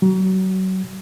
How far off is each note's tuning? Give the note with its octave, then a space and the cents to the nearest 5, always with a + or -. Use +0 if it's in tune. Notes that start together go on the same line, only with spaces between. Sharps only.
F#3 +30